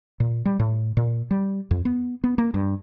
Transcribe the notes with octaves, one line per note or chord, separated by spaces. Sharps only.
A#2
G3
A2
A#2
G3
F2
B3
B3
A#3
G2